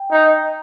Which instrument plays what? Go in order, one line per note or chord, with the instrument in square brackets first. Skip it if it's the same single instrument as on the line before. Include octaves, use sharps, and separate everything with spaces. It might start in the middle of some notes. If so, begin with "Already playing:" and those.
Already playing: [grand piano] G5
[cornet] D#4